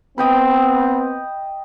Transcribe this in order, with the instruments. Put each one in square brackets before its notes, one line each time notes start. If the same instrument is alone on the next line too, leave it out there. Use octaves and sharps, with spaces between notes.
[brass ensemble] B3 C4 [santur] D#5 G5 B5